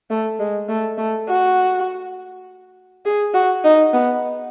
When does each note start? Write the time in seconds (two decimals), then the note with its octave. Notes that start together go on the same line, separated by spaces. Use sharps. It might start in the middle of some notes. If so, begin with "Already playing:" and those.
0.10 A3
0.39 G#3
0.69 A3
0.98 A3
1.28 F#4
3.05 G#4
3.34 F#4
3.64 D#4
3.93 B3